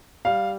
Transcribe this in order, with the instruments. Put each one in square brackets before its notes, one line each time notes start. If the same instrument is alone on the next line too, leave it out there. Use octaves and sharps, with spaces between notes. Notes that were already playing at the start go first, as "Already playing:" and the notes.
[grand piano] G3 F5